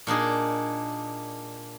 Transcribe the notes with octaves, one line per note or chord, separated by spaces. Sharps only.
A#2 D4 D#4 G#4